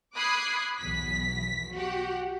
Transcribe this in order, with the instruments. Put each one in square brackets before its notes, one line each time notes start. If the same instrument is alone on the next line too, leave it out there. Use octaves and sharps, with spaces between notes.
[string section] B5 D6 D#6 F#6 G#6 C7
B1 E2 B6
F#4 G4 F#5